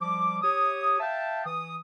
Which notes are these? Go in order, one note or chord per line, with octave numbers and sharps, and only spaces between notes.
F3 G3 D6
G4 C#5 D#6
E5 F5 G5 A5
E3 D#6